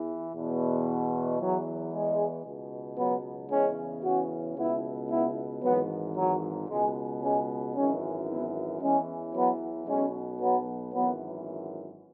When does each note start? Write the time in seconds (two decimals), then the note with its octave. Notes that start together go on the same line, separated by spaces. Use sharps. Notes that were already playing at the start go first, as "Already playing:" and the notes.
Already playing: E2 E3
0.33 E2 B2
1.39 E2 E3 F#3
1.92 G#3
2.44 C#2 B2
2.97 F#3 B3
3.51 E2 C#3 E3 G#3 C#4
4.04 C#4 F#4
4.57 C#2 B2 B3 E4
5.09 B3 E4
5.63 G#1 G#2 E3 F#3 B3
6.16 F#3
6.69 C#2 B2 G#3
7.22 G#3 C#4
7.75 G#1 F#2 E3 G#3 C#4
8.27 B3 E4
8.81 E2 E3 G#3 C#4
9.34 F#3 B3
9.87 B1 B2 G#3 C#4
10.40 F#3 B3
10.93 G#1 F#2 E3 F#3 B3